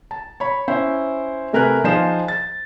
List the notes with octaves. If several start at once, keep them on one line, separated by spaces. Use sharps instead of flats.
A5
C#5 B5
C#4 E4 C5
C3 A3 A#4 B4 G#5 F#6
F3 D#4 G#4 C5 F5 E7
A6